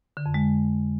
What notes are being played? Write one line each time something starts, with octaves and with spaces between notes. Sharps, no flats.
D3
F2
G#3